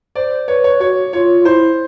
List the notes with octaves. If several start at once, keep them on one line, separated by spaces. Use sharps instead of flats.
C5 D5
B4 C#5
C#5
F#4 C#5
F4 C#5
F4
E4 C5